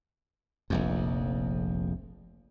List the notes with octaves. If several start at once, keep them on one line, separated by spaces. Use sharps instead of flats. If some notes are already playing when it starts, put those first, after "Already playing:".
F1 A#1 F2